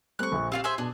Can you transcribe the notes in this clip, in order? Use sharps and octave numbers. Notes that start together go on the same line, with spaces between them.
G3 A3 C4 C#6 F#6
A#1 A#2
C4 F4 G4 F5
G#4 C5 E5
B2 D4 G#4